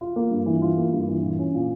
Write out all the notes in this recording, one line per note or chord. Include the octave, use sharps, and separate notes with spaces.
F4
A#3
G2
E3
F4
A#3
G2
E3
A#2
C#4
A#2